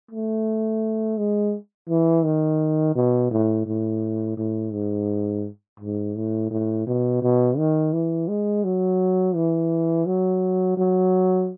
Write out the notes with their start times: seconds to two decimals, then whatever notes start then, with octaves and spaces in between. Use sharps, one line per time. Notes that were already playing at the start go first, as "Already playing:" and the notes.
0.11 A3
1.18 G#3
1.89 E3
2.25 D#3
2.95 B2
3.31 A2
3.66 A2
4.37 A2
4.73 G#2
5.80 G#2
6.16 A2
6.51 A2
6.87 B2
7.22 B2
7.58 D#3
7.93 E3
8.28 G#3
8.64 F#3
9.35 E3
10.06 F#3
10.77 F#3